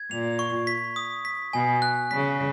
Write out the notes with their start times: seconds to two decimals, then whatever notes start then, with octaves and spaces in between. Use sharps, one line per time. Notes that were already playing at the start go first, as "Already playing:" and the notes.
Already playing: G#6
0.11 A#2 F7
0.39 C#6
0.67 B6
0.96 D#6
1.25 B6
1.53 B2 G#5
1.82 F#6
2.11 C#3 B6